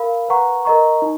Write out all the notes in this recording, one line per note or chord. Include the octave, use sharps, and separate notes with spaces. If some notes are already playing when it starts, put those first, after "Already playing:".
Already playing: A#4 F5 B5
B4 F#5 A#5 C#6
A#4 D#5 A#5 C#6
D#4